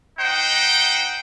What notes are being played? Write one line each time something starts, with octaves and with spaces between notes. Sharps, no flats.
D#4 C5 F#5 G5